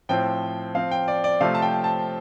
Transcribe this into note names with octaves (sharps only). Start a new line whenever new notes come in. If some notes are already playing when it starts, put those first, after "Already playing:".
A2 F3 C4 G5
F3 C4 F5
G5
D5
D5
C3 F3 A3 C4 F5
A5
G5
A5